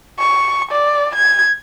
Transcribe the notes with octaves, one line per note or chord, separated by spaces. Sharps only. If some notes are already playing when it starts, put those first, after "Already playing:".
C#6
D5
G#6